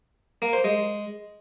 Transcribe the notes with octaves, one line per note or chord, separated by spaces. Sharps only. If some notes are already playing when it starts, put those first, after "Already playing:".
A#3
C5
G#3